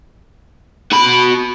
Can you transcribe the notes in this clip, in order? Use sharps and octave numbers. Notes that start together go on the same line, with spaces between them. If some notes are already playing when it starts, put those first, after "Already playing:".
F#4 B5